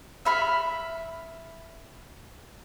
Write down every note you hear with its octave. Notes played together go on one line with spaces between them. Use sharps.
E5 B5 F6